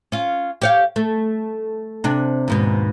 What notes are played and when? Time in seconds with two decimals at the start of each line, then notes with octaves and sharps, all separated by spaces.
0.12 C#4 F4
0.62 G4 C#5 F5
0.96 A3
2.04 C3 D4
2.48 D#2 G#2 B2